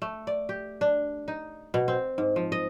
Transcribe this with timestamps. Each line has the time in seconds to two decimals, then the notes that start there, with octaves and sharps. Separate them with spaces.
0.02 A3
0.27 D5
0.49 G4
0.81 D4
1.28 D#4
1.74 B2
1.88 C4
2.18 G#2
2.36 F3
2.52 D#5